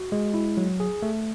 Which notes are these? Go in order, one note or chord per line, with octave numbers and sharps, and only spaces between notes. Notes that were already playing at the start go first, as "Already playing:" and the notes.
Already playing: F#4
G#3
E4
F#3
G#4
A3